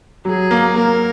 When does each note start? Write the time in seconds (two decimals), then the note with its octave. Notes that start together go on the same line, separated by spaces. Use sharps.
0.25 F#3 G#4
0.51 A#3
0.76 A#3 A#4